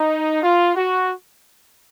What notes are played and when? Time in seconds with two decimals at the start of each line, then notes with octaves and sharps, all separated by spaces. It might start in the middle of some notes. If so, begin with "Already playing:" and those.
Already playing: D#4
0.42 F4
0.76 F#4